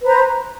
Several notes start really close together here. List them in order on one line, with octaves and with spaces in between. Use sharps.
B4 C5 A#5